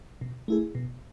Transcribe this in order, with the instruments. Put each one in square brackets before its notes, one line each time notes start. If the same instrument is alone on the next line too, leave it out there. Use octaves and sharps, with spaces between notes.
[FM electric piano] B2
A3 E4 G#4
B2